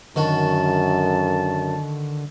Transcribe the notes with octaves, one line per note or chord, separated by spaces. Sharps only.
F#2 D3 D#3 F#4 A5